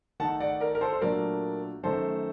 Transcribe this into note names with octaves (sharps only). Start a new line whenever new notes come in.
D#3 A3 D#4 F#5 A5
D5 F#5
A#4 D5
A#4
A4 C5
C5
A#2 F#3 A3 D4 A#4 D5
F#2 D#3 A3 A4 C5